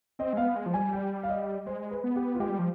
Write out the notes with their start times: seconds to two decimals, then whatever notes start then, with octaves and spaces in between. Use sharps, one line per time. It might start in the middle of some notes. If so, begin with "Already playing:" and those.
0.19 C4 D#5
0.33 G#3
0.37 B3 F5
0.56 G#3
0.66 F3
0.74 G3 G#5
0.93 G5
1.23 F5
1.30 D#5
1.66 G#3 C5
1.91 B4
2.04 B3
2.16 G4
2.35 F4
2.40 G#3 G4
2.49 G3
2.59 F3